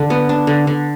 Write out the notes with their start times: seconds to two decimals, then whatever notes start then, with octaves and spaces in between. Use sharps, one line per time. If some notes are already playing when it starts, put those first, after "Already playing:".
Already playing: D3 D4
0.10 B3
0.29 D4
0.47 D3
0.67 D3